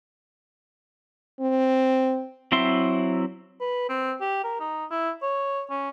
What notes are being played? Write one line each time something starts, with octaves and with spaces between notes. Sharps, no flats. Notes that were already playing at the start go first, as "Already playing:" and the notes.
C4
F#3 C4 E4 E5 C6
B4
C4
G4
A#4
D#4
E4
C#5
C#4